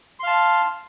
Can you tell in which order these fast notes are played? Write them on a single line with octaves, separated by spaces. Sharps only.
C6 F5 A5